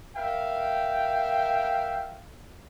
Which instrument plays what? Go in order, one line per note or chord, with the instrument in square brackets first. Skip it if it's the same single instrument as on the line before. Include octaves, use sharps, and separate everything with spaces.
[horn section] A#4 E5 F5 G5